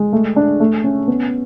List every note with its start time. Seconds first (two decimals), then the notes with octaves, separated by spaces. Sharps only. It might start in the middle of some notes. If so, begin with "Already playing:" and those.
Already playing: G#3
0.13 A3
0.36 D4
0.60 A3
0.84 C#4
1.08 B3